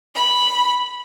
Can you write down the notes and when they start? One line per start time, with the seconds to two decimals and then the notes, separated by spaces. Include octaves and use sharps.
0.15 B5